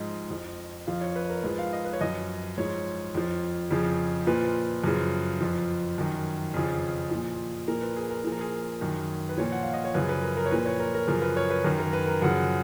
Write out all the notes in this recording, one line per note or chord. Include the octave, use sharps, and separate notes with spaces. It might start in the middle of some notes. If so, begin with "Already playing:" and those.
Already playing: G#2 F3 D#5
F2 F3
F2 F3 F5
C#5
B4
A#4
G#2 F3 B4
F5
D#5
B4
C#5
F#2 F3 D#5
G#2 F3 C#5
F2 F3
F2 C#3 F3
A#2 F3 B4
F#2 C#3 F3
F2 F3
F#2 D#3
F2 C#3 F3 G#4
A#2 F3
A#2 F3 A#4
B4
G#4
A#4
A#2 F3 G#4
A#4
G#4
F#2 D#3
B4
A#2 F3 C#5
F#5
F5
D#5
C#5
F#2 C#3 F3 B4
B4
A#4
A#4
C#5
A#2 F3 B4
C#5
A#4
A#4
F#2 C#3 F3 A#4
B4
C#5
B4
F#2 D#3 A#4
A#4
B4
A#4
F#2 C#3 F3 F#5